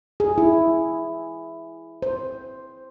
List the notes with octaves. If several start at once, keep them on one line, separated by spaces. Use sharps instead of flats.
G#4
E4
C5